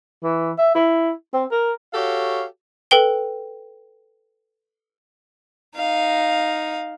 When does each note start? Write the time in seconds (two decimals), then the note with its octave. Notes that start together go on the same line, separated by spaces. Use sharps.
0.23 E3
0.58 E5
0.75 E4
1.34 C4
1.51 A#4
1.94 F#4 G4 A4 C#5 F5
2.91 A4 B4 G5 G7
5.77 D#4 F5